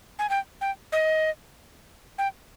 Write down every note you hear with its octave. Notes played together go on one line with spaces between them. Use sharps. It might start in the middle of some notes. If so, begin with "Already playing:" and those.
G#5
G5
G5
D#5
G5